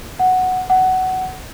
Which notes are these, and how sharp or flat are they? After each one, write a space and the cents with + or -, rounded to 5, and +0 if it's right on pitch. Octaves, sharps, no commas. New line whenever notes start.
F#5 +0
F#5 +15